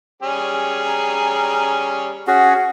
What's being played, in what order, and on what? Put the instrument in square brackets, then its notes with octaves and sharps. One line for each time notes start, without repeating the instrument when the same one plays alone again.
[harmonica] G3 C#4 G#4
[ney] A#5
[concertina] C#4 F#4 G#4 [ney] F#5